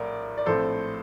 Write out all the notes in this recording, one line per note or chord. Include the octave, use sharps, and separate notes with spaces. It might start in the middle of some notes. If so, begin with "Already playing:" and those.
Already playing: A#1 A2 A3 A#4 D5
D5
A#1 A2 A3 C4 A4 C5